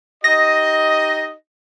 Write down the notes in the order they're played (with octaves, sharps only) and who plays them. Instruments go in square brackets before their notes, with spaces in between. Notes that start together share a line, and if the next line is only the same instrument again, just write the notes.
[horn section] D#4 G4 D#5 [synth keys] A#6